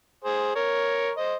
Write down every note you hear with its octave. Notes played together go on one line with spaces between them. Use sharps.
G#4 C5
A#4 C#5
C5 D#5